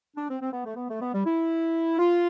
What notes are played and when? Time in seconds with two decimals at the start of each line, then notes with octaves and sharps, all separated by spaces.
0.16 D4
0.29 C4
0.41 C4
0.52 B3
0.65 A3
0.76 B3
0.89 A3
1.01 B3
1.14 G3
1.26 E4
1.99 F4